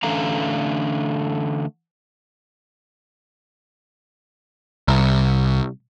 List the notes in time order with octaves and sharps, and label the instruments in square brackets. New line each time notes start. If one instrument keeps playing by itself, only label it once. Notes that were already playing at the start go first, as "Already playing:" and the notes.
[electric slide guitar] D3 E3 A3 C#4 F5 A#5
[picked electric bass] C2